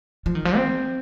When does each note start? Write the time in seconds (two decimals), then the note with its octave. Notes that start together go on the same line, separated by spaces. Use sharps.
0.26 F3
0.35 D#3
0.45 F3
0.56 C4